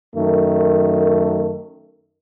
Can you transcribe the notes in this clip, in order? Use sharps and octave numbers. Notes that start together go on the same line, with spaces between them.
F#2 D#3 A3